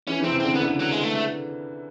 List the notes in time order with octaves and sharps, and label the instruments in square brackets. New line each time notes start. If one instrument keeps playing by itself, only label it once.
[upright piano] E3 [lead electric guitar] C#4
[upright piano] E3
[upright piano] C3 [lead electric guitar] C4
[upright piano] C#3
[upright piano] D3 [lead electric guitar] C4
[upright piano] C#3 [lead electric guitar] B3
[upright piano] D3
[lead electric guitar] F#3
G#3
A3
A3